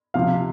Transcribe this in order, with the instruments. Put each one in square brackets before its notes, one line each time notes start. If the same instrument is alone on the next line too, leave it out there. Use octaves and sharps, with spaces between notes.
[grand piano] C3 F3 F5